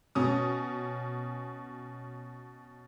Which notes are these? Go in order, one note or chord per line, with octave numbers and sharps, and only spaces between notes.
B2 C#4 D#6